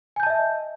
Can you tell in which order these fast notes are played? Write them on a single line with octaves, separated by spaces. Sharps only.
G#5 G6 A5 D#5 E5